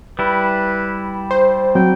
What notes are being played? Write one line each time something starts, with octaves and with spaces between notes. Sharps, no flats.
G3 E4 B4
C5
F#3 C4 G5